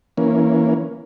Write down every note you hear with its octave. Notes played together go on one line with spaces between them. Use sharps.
E3 A#3 C#4